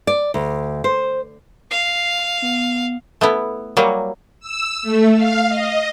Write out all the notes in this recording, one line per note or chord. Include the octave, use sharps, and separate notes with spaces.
D5
D2
C5
F5 C7
B3
A3 B3 E4
F#3 G3 A#3 C#5
E6
A3
F5
D#5